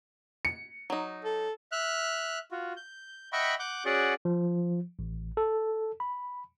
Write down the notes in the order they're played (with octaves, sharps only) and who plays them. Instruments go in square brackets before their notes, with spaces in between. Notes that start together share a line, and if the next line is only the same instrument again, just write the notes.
[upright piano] C#7
[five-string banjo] F#3 D#4
[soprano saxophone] A4
[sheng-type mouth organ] E5 F6 F#6
F4 F#4
G6
D#5 E5 F#5 G5 B5 C#6
F#5 D6 G6
C#4 F#4 G#4 D5 F#5
[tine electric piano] F3
A1
A4
B5